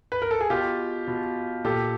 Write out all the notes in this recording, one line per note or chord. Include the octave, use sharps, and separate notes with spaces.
B4
A#4
A4
G#4
B2 F4 G4
B2
A#2 G4 A4